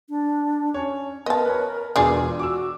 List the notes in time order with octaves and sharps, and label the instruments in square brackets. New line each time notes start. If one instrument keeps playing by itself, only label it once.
[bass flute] D4
[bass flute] C#4 [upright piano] C#5
[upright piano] B3 [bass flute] A#4 [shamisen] D#5 A5
[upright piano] B4 C#5
[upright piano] E1 B2 G#5 [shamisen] D4 G#4 D5 [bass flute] F4
[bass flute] F#4 [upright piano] D6 E6